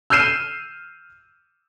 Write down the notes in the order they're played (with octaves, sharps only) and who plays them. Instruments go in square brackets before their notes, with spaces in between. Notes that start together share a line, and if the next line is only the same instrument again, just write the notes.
[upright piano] E6 F6 G6 C7 D#7 E7